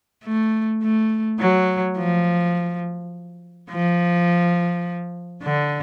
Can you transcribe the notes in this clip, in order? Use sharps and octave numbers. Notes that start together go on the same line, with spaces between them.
A3
A3
F#3
F3
F3
D3